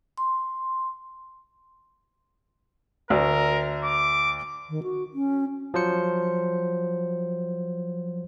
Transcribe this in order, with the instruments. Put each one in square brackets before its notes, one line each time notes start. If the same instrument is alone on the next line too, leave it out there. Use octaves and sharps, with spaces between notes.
[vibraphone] C6
[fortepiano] D2 [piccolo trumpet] A#4
[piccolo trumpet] D6
[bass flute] D#3
F#4
C#4
[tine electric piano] F3 F#3 C5 C#7